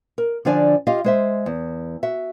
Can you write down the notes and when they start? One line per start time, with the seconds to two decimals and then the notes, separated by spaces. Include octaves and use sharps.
0.18 A#4
0.45 D3 F3 D4 D5 G#5
0.87 F4 G4 D#5 F5
1.04 G#3 C5 E5
1.46 E2
2.03 F#4 E5